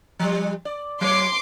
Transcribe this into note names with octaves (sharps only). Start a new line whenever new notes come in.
F3 G3
D5
F#3 C#5 C6 D6